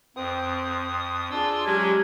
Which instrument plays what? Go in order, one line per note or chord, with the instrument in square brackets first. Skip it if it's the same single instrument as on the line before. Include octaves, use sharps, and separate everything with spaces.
[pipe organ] F2 D#6 [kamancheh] C4
[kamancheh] D4 G#4 [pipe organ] F4 C6 E6
[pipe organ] F#3 G#3 C#4 [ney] G4 [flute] G#6